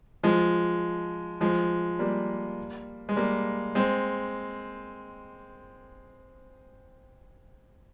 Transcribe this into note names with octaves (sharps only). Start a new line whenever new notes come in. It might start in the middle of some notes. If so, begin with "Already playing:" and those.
F3 G#3
F3 G#3
G3 A#3
G#3
G3 A#3
G#3 C4